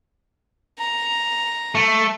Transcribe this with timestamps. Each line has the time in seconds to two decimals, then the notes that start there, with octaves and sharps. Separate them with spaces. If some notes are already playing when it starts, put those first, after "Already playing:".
0.79 A#5
1.75 A3